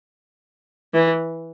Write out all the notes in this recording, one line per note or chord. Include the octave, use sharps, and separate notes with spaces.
E3